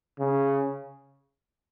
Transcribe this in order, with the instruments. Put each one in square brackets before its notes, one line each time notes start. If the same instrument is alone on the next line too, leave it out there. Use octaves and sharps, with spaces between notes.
[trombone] C#3